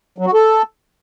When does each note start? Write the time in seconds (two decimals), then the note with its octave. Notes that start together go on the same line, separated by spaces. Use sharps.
0.18 F#3
0.26 F#4
0.34 A4